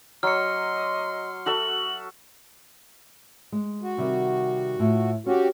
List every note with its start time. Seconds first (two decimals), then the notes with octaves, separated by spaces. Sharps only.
0.23 F#3 D#5 C6 F6 C#7
1.46 F#4 A4 E5 F#7
3.52 G#3
3.82 F#4
3.98 C3 D#3 G3
4.79 A2 F4
5.26 C#4 F#4 G4